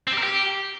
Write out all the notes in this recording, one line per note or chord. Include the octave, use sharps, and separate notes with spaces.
C4
G4
A#4
G4